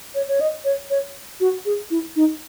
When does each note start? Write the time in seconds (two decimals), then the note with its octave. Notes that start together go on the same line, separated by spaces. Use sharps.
0.15 C#5
0.28 C#5
0.41 D#5
0.65 C#5
0.90 C#5
1.40 F#4
1.66 G#4
1.91 E4
2.16 D#4